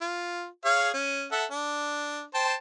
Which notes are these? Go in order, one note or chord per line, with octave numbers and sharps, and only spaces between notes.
F4
G#4 C#5 F5
C#4
A4 E5 F#5
D4
C5 G5 A5